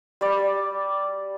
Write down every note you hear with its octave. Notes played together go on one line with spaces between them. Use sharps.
G3 D5